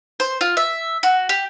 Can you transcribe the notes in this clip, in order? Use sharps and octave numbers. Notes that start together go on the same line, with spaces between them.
C5
F4
E5
F#4
G4